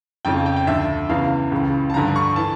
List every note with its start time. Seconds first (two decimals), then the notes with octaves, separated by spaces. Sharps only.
0.25 F2 C#3 F3 G5
0.46 G5
0.56 G5
0.67 D2 D3 F3 E5
1.09 E2 C#3 E3 F5
1.52 C#2 C#3 E3
1.90 A5
1.94 G2 D3 F3 A#5
2.16 C#6
2.36 E3 A5